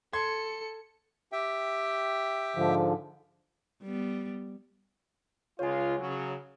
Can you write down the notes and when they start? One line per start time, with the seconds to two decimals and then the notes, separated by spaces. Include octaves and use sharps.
0.13 A4 C6 G#6 C#7
1.32 G4 E5 G5
2.56 G#2 D3 F3
3.82 G3 B3
5.59 C#2 G#3 F4 C#5 G#5
5.99 C#3 F#3